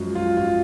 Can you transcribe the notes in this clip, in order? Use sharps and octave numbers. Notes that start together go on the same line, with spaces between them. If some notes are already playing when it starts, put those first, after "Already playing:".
Already playing: F#2 F3 G#3 F#4
F4
F4